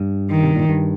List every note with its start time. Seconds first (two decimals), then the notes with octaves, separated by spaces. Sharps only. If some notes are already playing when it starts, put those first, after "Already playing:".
Already playing: G2
0.30 D#3
0.43 C3
0.56 A#2
0.69 G2